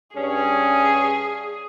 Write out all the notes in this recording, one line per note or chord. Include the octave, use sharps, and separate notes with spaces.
G2 C#4 G#4